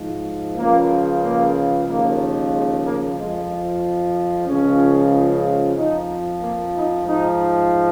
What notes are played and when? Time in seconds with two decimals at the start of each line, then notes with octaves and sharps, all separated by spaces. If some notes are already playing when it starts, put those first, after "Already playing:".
Already playing: G#2 F3
0.56 C#2 C#3 F3 A#3
1.22 A#3
1.86 D#2 C#3 F3 A#3
2.51 G#3
2.83 A#3
3.15 F2 F3 G#3
4.46 C#2 C#3 F3 C#4
5.75 F2 F3 D#4
6.40 A#3
6.72 D#4
7.05 G#2 F3 D#4